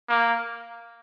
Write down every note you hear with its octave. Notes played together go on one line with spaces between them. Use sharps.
A#3